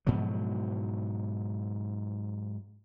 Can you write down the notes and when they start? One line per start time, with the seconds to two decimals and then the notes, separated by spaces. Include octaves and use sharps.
0.07 G#2 B2 F3 F#3